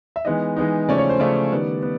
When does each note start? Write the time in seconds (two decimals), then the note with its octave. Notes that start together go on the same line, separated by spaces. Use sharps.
0.16 E5
0.25 E3 G#3 B3 D#4 D#5
0.57 E3 G#3 B3 D#4
0.88 C#3 F3 A3 C#4 D5
0.98 C#5
1.09 C5
1.19 C#3 F3 A3 C#4 D5
1.51 D#3 G3 B3
1.82 B3